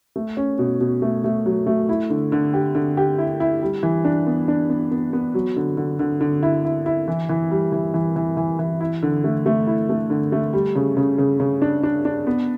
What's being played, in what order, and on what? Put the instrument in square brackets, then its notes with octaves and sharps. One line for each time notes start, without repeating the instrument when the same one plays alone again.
[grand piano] A3
C#4
B2
B2
A3
A3
F#3
A3
E4
D3
D3
G4
D3
G4
E4
E4
G3
E3
D4
B3
D4
B3
B3
B3
F#3
D3
D3
D3
D3
E4
E4
E4
E3
E3
G3
E3
E3
E3
E3
E3
E4
D3
A3
A3
E4
A3
D3
A3
G3
C#3
C#3
C#3
C#3
D4
D4
D4
B3